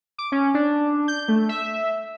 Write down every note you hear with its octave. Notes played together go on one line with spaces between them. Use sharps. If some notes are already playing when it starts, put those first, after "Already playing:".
D6
C#4
D4
G6
A3
E5